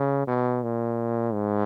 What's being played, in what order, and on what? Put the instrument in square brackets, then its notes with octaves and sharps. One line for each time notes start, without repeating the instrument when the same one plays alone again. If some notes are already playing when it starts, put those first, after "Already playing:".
Already playing: [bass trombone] C#3
B2
A#2
G#2